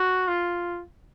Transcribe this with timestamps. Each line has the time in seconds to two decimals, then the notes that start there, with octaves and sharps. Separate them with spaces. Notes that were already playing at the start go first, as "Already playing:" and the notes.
Already playing: F#4
0.28 F4